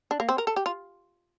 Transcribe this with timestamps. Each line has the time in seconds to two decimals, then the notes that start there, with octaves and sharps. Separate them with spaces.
0.11 D4
0.20 A#3
0.29 C4
0.38 A#4
0.47 A4
0.56 G4
0.66 F4